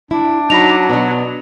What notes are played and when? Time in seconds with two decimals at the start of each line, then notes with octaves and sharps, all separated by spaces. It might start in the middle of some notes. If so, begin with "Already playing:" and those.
0.11 D4 E4
0.50 F#3 D#4 B5 A#6 F7
0.89 B2 B3 D4